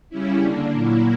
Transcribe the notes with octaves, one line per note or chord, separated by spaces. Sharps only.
C#3 G3 C#4 E4
D3 A#3 D4
A#2 F#3 A#3 E4